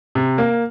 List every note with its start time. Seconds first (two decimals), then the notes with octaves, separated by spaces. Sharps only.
0.15 C3
0.38 A#3